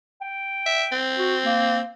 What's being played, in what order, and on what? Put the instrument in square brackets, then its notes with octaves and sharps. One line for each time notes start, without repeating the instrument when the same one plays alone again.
[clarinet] G5
[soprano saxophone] E5
C4
[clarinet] F#4
A#3